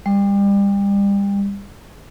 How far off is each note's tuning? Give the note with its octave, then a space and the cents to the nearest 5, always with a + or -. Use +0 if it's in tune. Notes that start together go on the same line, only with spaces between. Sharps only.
G3 +30